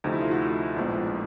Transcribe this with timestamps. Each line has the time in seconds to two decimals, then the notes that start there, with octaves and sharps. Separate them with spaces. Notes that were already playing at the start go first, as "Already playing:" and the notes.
0.04 D2 C3 F3 A3 D#4
0.13 E4
0.21 F4
0.31 F#4
0.76 A#1 A2 F3 G#3 B3